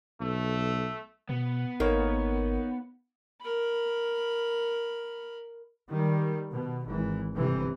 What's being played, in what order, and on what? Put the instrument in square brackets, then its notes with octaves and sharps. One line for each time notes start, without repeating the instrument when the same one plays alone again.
[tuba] B1 [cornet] A3
[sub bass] B2 [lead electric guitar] B3
[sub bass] G#1 [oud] A#3 [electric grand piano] D#4 C#5
[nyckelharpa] A#4 B5
[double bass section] D#3 G3
B2
G#1 E3
G1 C3 E3